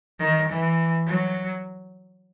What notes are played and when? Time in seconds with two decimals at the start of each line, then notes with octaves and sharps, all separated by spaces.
0.19 D#3
0.48 E3
1.07 F#3